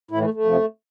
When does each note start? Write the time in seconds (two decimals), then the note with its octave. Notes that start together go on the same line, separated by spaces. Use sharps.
0.11 A2 E4
0.15 E3
0.22 A3
0.34 A3
0.45 F2 C3 F3